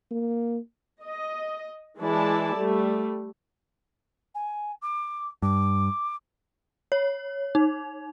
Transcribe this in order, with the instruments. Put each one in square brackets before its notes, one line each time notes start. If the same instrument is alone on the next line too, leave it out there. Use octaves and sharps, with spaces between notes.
[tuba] A#3
[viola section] D#5
E3 G#3 E4 D5 A5
G3 A3
[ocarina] G#5
D6
[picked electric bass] G2 [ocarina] D6
[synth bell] C#5
D#4